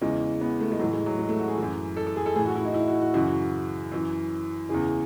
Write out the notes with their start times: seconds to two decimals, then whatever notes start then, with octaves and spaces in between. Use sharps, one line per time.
0.01 E2 C#3 E3 G#3
0.41 B3
0.60 A3
0.72 G#3
0.79 A2 E3 F#3
0.93 G#3
1.06 F#3
1.19 G#3
1.29 A3
1.39 F#4
1.48 G#4
1.58 F#2 E3
1.97 A4
2.07 A4
2.16 G#4
2.26 A4
2.36 A2 E3 G#4
2.46 F#4
2.55 E4
2.65 D#4
2.74 E4
2.88 F#4
3.01 F#4
3.14 F#2 C#3 E3 F#4
3.92 F#2 E3
4.69 E2 C#3 E3 G#4